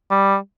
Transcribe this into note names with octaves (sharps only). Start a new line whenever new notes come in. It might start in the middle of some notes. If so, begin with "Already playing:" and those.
G3